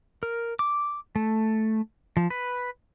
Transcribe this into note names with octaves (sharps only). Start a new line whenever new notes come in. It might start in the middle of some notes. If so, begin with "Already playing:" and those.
A#4
D6
A3
F3
B4